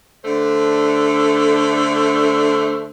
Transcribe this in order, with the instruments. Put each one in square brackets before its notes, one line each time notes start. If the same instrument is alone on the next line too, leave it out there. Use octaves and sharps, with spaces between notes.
[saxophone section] D3 A3 D4 C5